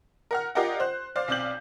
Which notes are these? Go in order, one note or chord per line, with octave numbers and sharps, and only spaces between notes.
A#4 F#5 F6
F4 G4 A#4 D5 D#5 F#5
C5 F#6
C5 D5 F5
B1 C4 D5 F5 G6 F#7